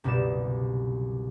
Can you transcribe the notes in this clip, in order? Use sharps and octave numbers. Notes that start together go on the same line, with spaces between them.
F#1 C2 B2 G4 D5 E7